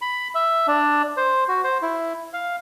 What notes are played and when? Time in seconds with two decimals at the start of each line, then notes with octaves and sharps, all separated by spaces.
0.01 B5
0.35 E5
0.68 D4
1.17 C5
1.48 F#4
1.64 C5
1.82 E4
2.33 F5